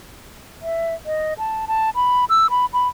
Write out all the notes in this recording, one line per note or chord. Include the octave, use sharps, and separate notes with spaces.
E5
D#5
A5
A5
B5
E6
B5
B5